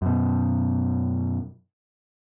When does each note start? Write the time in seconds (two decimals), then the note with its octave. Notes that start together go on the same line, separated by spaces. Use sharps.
0.02 F#2 B2